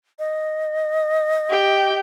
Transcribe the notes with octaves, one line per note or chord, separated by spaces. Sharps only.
D#5
G4 G5